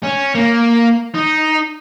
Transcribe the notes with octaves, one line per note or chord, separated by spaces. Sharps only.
C#4
A#3
D#4